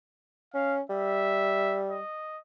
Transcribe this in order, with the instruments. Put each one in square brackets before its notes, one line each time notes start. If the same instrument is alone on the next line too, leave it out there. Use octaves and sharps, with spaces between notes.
[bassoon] C#4 [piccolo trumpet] F5
[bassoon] G3 [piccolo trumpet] E5
[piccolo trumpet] D#5